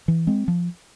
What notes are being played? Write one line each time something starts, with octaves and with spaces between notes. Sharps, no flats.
E3
G#3 C4
F3